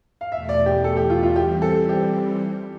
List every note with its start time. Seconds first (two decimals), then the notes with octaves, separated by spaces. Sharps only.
0.21 F5
0.31 E2 B2 A3 E5
0.49 D5
0.66 G4
0.84 A4
0.97 G4
1.10 F4
1.23 F4
1.36 E3 G3 C4 G4
1.62 A4
1.89 G4